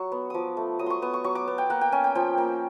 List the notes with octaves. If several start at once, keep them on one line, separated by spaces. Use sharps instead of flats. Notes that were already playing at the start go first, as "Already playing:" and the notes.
Already playing: F#3 C#6
B3
F3 D6 D#6
A3
F#3 D#6
C6 C#6
B3 D#6
C#6
F#3 C#6
D6
B3
G5
A#3 F#5
G5
C#4 G#5
G5
F3 G5
A#3